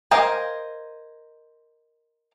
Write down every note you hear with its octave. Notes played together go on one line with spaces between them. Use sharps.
A#4 C5 D#5 F5 G#5